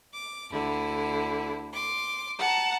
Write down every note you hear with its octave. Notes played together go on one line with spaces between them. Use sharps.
D6
D2 D3 E4
C6 D6
F#5 A5 A#5